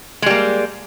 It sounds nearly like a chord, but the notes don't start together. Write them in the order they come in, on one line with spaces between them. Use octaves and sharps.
G#3 G3 A#3